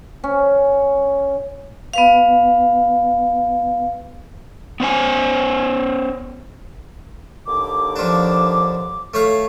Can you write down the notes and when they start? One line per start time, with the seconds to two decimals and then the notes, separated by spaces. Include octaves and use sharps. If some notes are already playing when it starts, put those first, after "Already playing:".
0.24 C#4
1.93 B3 B4 F5
4.80 B3 C#4 C5 G#5
7.47 D#2 D3 D6
7.96 F3 D4
9.14 A3 C#5 F5